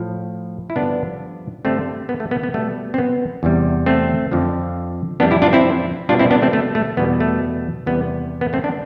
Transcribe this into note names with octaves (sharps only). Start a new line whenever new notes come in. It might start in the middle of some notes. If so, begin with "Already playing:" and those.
Already playing: A2 F3
E4
G2 D3 F3 B3 D4
G2 D3 G3 A3 C4
B3
A3
B3
B3
B2 G3 A3
C4
B3
E2 C3 G3
A3 C4
F2 D3 F3
F2 E3 G3 B3 D4
E4 G4
D4 F4
C4 E4
B2 G3 D4 F4
C4 E4
B3 D4
A3 C4
A3
A3
E2 B2 G3 B3
A3
E2 C3 G3 B3
B3
A3 C4
B3 D4